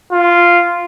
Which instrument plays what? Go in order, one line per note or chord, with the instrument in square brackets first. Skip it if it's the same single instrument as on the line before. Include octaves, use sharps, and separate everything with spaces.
[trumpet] F4